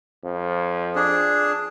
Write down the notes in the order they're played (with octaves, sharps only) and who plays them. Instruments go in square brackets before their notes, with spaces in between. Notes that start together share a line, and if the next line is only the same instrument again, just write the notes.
[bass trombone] F2
[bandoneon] D4 G#4